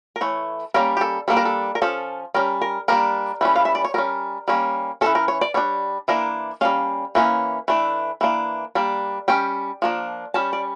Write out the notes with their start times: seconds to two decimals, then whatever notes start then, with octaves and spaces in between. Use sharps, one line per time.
0.16 A#4
0.21 E3 A3 C#5
0.74 G3 A#3 C#4 A#4
0.97 G4
1.01 A4
1.28 G3 A#3 D4 A4
1.37 A#4
1.45 A4
1.75 A#4
1.82 F3 C#4 A4
2.34 G3 C#4 A#4
2.61 A#4
2.88 G3 A#3 D4 A#4
3.41 E3 G3 C#4
3.56 F5
3.65 E5
3.75 D5
3.85 C#5
3.94 G3 C#4 A#4
4.48 G3 A#3 C#4
5.01 E3 A3 C#4 A4
5.15 A#4
5.28 C#5
5.41 D5
5.54 G3 D4 C#5
6.08 E3 A#3 D4 A#4
6.61 G3 A#3 C#4 F5
7.15 E3 A#3 C#4
7.68 E3 A3 D4
8.21 E3 A#3 D4
8.75 G3 A#3 D4
9.28 G3 C#4 G5
9.82 F3 A#3 D4
10.34 G3 C#4 A5
10.53 D5